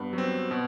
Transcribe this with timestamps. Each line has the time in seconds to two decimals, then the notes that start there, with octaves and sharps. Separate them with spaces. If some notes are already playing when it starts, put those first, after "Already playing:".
Already playing: G2 B3
0.13 F#3
0.18 C4
0.51 B2